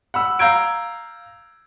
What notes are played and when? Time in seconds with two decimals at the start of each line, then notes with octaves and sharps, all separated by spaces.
0.14 F#5 B5 E6
0.39 F5 A#5 E6 G6 G#6 D7